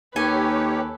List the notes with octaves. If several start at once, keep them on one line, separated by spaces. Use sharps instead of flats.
D#2 D#3 G4 A4 B4 C#5 G#5